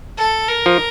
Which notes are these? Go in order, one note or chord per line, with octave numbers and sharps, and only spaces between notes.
A4
A#4
F3